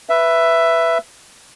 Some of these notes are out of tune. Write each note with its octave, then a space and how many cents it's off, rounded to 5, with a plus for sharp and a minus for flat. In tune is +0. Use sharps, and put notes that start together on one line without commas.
B4 +0 E5 +10